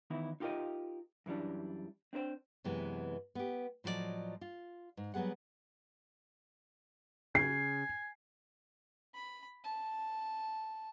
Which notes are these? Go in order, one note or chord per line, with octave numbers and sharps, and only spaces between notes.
D#3 E3 B3 D#4 E4
D#4 F4 G4 A4 A#4 D#5
F#2 E3 G3 D4
C4 D4 A#4 C5 G5
F#2 C3 E3 G#3 B3
B3 G4
A2 F3 F#3 F4 D5 D#5
F4
G#2
F#3 G3 B3 G#4 F#5
C#3 G#5 C7
B5
A5